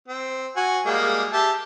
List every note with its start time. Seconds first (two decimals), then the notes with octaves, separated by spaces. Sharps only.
0.09 C4
0.56 F#4 G#5
0.86 G3 G#3 A#3
1.33 G4 E5 A5